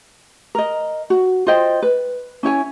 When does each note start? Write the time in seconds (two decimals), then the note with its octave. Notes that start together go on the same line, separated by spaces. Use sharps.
0.55 A#4 D#5
1.10 F#4
1.47 F4 C5 D#5 G5
1.82 B4
2.43 C#4 E4 C#5 G#5